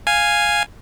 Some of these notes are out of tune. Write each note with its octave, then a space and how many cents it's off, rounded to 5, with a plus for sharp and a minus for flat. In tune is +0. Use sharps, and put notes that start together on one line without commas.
F5 +0 G#5 -5